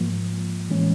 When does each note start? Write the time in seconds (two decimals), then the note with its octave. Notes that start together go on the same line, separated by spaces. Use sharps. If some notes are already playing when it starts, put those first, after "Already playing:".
Already playing: G#2 F3 A#3
0.70 A2 E3 G#3 C#4